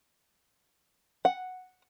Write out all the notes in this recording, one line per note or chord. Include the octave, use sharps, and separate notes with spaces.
F#5